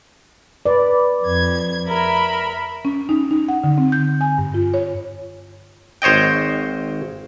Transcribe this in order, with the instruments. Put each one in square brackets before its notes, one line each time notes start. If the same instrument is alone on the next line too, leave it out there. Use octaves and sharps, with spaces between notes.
[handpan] B4 D5
[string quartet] F2 G#6
A#4 E5 B5
[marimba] C#4
D#4
D#4
F#5
D3
C4
G6
G#5
G2
F4
C#5
[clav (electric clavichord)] G#1 C5 C#5 D#5 G5